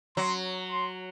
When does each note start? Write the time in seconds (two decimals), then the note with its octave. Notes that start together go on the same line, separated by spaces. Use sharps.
0.17 F#3 C6
0.71 C6